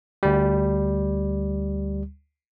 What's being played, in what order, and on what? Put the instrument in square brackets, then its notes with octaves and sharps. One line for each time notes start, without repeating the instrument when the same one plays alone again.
[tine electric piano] D2 G3